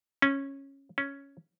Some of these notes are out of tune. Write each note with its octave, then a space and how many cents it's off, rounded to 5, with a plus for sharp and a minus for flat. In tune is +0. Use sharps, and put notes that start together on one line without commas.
C#4 -10
C#4 +5